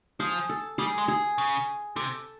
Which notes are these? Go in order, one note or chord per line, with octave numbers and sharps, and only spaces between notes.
F3 G#4
A4
G3 G#4
G#3
G#4
C#3
C3 A4